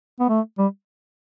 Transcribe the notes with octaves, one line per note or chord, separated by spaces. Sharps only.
B3
A3
G3